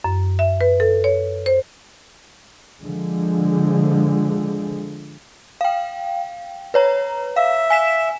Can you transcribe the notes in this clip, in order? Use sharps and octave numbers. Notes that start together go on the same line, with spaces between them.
F#2
E5
B4
A4
C#5
C5
D3 F3 G#3
F5 G5
B4 C#5 A#5
E5 F5
G#5 B6 E7